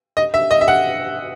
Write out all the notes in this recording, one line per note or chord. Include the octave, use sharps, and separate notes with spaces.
D#5
E5
D#5
E5
F#5